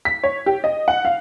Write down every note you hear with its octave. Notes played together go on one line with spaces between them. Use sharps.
B6
C#5
G4
D#5
F#5
F5